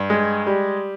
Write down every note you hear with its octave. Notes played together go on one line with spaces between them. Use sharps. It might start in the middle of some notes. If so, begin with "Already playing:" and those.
Already playing: G2
G#3
G3